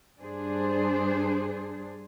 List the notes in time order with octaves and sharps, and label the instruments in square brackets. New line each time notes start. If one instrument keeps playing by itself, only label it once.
[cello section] G2 D4 G#4 C5